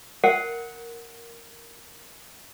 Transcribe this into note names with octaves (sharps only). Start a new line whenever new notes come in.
A#4 F#5